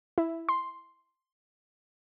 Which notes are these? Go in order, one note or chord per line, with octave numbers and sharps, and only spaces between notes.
E4
C6